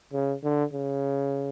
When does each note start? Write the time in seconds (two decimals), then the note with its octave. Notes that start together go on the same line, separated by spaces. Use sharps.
0.13 C#3
0.43 D3
0.73 C#3